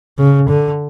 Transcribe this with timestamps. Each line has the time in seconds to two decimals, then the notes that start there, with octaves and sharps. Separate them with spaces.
0.18 C#3
0.49 D3